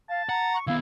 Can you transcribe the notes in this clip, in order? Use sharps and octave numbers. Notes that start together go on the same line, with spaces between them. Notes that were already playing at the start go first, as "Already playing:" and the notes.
F5 A5
F#5 A#5
C#6
D#3 B3 E4 F5